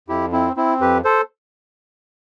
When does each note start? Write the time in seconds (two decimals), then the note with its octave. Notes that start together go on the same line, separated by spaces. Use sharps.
0.08 F2 E4 G4
0.32 C4 E4
0.56 C4 E4
0.81 F2 G4 B4
1.04 A4 C5